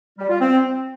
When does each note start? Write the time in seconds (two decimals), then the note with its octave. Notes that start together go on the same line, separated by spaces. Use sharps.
0.18 G3
0.29 F4
0.40 C4